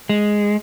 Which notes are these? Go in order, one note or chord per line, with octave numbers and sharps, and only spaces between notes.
G#3